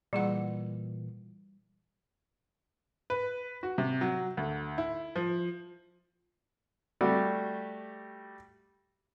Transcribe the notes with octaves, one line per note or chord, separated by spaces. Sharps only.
A#2 E3 G3 G#4 F#5
B4
F#4
C3
F#3
D2
E4
F3
G3 A3 F#4 G4